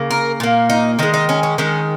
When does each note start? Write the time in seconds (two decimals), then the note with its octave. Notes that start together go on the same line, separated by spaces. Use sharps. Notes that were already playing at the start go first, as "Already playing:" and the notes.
Already playing: C#3 A#3
0.11 A#4
0.40 A#2 A#3
0.70 D#4
0.99 D#3 G#3 D#4
1.14 D#4
1.29 C#4
1.43 C#4
1.58 D#3 G#3 C#4